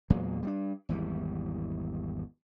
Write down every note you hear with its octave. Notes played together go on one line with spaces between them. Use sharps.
E2 A#2 F#3 G#3
G3 G#3 D4
G#1 E2 E3 G3